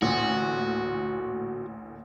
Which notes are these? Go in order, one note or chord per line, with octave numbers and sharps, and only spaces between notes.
A1 D2 A#2 F#4